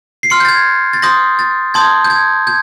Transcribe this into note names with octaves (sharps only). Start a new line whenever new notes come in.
C7
C6 F6 C#7
G6
A6
G#6
A6
C6 D#6 G6 A#6
A6
A5 C6 D#6 G6 G#6
G6
G#6
G6 G#6